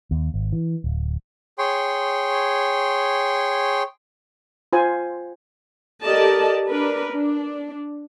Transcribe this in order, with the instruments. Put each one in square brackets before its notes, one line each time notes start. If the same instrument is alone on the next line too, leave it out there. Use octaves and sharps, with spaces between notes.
[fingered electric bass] D#2
G#1
E3
D1
[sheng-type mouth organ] G#4 C#5 G5 C6
[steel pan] F4 C5 G#5
[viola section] G4 A4 A#4 D5 D#5 A5
D4 A#4 B4
D4